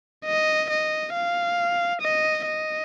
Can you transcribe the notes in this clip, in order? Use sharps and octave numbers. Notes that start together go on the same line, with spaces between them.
D#5
D#5
F5
D#5
D#5